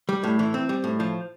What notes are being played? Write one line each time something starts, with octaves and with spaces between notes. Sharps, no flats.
G3
A2
E3
C4
G3
A2
F3